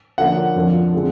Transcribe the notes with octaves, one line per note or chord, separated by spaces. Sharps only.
D3 F3 A#3 C#4 F#5
F2 D3 F3
D3 F3 G#3 C4